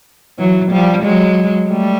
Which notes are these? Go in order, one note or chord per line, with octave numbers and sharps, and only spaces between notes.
E3 F#3
F3 G3
F#3 G#3
G3 A3